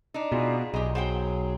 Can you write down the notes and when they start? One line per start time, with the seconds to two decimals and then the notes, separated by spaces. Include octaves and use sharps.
0.14 D4 D#4
0.32 B2 F4 G#4
0.74 B1 G4 G#4 D#5
0.95 F#3 G#4 C5 F#5 G5